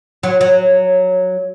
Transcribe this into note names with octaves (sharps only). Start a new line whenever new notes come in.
F#3
F#3